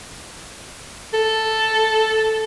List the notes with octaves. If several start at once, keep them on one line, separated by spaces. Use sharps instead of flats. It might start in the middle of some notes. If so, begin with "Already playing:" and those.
A4